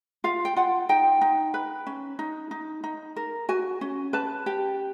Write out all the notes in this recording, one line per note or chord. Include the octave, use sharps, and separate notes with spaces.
F4 F5
G5
F4 F#5
D#4 G5
D#4
B4
C#4
D#4
D#4
D#4
A#4
F#4 G#5
C#4
B4 A5
G4 G5